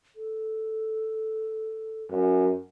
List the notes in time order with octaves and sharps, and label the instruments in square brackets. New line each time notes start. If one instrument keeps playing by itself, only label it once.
[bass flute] A4
[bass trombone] F#2